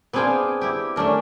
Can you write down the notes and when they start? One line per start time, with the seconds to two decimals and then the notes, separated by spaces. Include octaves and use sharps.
0.13 B3 C4 D4 G#4 F5 G5
0.61 E4 G4
0.96 A3 C#4 D4 A#4